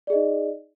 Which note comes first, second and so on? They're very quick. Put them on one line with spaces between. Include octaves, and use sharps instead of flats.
D5 G#4 D#5 D#4